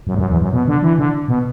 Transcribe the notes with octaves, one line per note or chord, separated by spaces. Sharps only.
F#2
G2
F#2
E2
F#2
B2
D3
E3
D3
B2